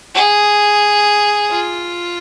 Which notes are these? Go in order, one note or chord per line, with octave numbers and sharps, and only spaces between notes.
G#4
F4